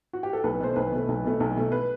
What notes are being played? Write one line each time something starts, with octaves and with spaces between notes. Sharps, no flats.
F#4
G4
A4
B1 B4
B2 A3 C5
B1 B4
B2 A3
B1
B2 A3
B1
B2 A3
B4